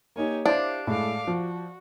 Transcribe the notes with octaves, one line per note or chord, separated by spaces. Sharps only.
A#3 D#4 G4 C#5 G#5
D4 E4 G4 C5 F5 D6
A2 G#3 A4 F5 D6
F3 F#4